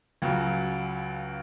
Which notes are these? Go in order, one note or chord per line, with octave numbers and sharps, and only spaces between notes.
C#2 C#3 F#3